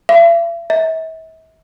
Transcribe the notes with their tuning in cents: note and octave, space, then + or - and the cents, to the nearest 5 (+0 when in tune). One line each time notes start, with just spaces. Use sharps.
E5 +45
E5 -40